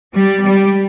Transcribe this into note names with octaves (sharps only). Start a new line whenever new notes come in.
G3
G3